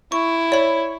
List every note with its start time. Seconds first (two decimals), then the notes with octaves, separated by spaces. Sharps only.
0.12 E4 C#6
0.52 C#5 D5 B5